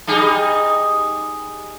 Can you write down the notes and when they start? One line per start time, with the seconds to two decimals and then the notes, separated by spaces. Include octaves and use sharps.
0.07 G3 D#4 G#4